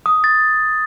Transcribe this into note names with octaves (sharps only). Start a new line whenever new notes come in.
D#6
A6